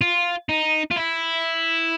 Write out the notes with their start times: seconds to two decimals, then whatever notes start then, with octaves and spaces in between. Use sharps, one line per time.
0.01 F4
0.49 D#4
0.91 F4
0.96 E4